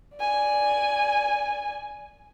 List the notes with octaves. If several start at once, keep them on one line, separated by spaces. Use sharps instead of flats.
D5 G#5